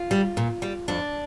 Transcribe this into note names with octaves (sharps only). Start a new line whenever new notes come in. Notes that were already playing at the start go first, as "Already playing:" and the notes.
Already playing: F4
G3
A#2
G3
F2 D4